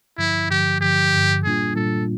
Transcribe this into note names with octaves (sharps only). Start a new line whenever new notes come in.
G2 D3 F3 E4
G2 D3 F3 G4
G2 D3 F3 G4
G2 D3 F3
A#2 G3 A#3 D4 F4 G#4
A#2 G3 A#3 D4 F4 A4